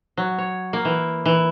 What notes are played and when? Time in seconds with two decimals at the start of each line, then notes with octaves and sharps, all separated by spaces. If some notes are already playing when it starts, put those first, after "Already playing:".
0.17 F#3
0.38 C#5
0.73 A#3
0.85 E3
1.26 E3